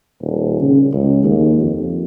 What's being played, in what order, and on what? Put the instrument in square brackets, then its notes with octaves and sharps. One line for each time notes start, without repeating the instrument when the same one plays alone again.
[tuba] D#1
C#3
C#2
D#2
F2